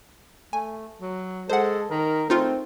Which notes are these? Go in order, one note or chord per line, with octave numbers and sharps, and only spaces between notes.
A3 G#5
F#3
G#3 A4 C5 F#5
D#3 A#4
A3 C4 D#4 F4 A#4